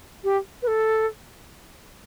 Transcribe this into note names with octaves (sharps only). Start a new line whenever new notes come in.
G4
B4
A4